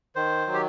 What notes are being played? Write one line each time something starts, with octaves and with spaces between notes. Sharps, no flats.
D#3 C5
F#3
G4